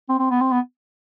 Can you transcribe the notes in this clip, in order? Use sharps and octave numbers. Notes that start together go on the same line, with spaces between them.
C4
C4
B3
C4
B3